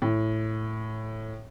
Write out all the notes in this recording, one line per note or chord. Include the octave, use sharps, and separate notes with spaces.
A2